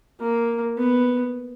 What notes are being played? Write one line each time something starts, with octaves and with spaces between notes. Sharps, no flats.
A#3
B3